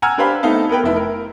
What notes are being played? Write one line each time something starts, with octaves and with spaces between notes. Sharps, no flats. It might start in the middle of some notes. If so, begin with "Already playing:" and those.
F#5 G#5 A#5 E6 F6 G#6
D4 G4 B4 C5 F5 B5
A3 B3 C4 D#4 F5 A5
B3 A#4 B4 G5
F1 E4
A#4